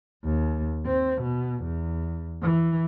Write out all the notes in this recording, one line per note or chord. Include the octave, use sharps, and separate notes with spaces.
D#2
C4
B2
E2
E3